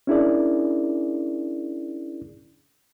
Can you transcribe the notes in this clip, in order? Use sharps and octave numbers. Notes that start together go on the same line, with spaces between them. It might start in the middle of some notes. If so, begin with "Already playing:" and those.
C#4 D4 E4 G#4 A#4 D5